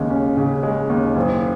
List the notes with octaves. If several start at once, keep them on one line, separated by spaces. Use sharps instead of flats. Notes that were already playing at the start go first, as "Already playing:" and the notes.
Already playing: D#2 C#3 G#3 C#4
C#4
C#3
G#3
D#2
F#1